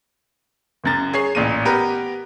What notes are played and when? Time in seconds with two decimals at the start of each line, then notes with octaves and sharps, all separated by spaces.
0.84 F#1 F#2 A6
1.14 G#4 C#5 C7
1.35 A1 A#2 A#3 D#7
1.65 B3 G4 A#4 B4